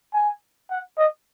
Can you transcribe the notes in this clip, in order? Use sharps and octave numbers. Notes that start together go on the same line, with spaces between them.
G#5
F#5
D#5